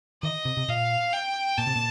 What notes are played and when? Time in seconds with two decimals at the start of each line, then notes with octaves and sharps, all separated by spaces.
0.22 D#3 D#5
0.45 C3
0.57 C3
0.68 A#2 F5
1.13 G5
1.58 A#2 A5
1.67 C3
1.75 A#2